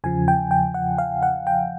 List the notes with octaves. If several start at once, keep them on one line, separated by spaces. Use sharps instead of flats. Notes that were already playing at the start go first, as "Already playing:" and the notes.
E2 C#3 F3 G#5
G5
G5
F#5
F5
F#5
G5